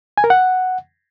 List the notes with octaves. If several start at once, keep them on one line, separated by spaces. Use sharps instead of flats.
G#5
A#4
F#5